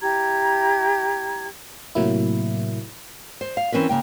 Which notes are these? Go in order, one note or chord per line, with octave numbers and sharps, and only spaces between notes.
E4 G4 A#5 G#6
A2 C3 F#3 A#3 E4
C5
F5
E3 C4 C#4 A#4 B4
C#3 A#3 G5